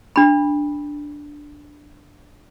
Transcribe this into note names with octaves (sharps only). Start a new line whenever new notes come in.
D4 B5